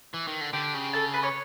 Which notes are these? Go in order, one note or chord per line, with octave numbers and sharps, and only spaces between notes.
E3
D#3
D3
D3 G4 G5
C#3
A4 A5
B4 B5
C#5 C#6